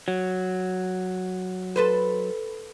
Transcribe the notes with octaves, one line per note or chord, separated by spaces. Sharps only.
F#3
A4 B4 C5